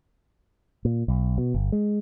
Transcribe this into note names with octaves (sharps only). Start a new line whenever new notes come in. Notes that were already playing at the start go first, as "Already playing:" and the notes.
A#2
B1
B2
G1
G#3